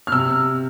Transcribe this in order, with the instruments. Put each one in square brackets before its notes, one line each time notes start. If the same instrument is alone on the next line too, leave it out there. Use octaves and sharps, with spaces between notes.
[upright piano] F6
C3 E6